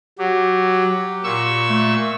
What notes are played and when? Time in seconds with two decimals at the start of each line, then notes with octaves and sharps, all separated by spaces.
0.19 F#3 G4
1.24 A#2 C#6 E6
1.70 A3